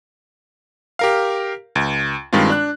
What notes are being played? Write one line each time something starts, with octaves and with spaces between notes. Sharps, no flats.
G4 A#4 F5
C#2
G2 D#3 G#3 C4 F4
D4 F#6